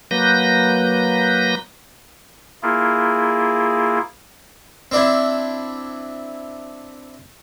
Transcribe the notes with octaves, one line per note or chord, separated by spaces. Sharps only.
F#3 A#3 B4 G6 A#6
A#3 E4 F4 G#4
C4 D4 E4